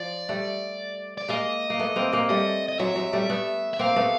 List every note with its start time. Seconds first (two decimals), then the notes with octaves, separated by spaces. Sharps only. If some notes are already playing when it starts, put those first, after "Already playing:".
Already playing: F3 D5
0.29 G3 A3
1.18 D5
1.28 G#3 A#3 D#5
1.70 A#3
1.79 A3 B3
1.96 A#3 C4
2.12 G#3 A#3
2.29 G3 A3 D#5
2.68 D#5
2.79 F#3 G#3 E5
2.96 F#3 G#3
3.13 G3 A3
3.29 A3 B3
3.74 E5
3.79 A#3 C4 F5
3.96 A3 B3